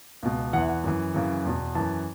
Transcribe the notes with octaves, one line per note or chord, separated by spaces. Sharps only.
C#2 B2
E2 E3 F#5
E5
F#5
F#2 E3
F#2 C#3 E3
E2 B2
F#2 E3 A5